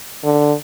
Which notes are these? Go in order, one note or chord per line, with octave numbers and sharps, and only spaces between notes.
D3